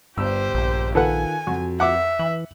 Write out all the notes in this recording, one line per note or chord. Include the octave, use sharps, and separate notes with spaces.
G1 G2 G4 C5 E6
A#1
D#3 F4 A4 B4 F#5 G#5
F2 F#4
E5 F#5 D6
E3 F#7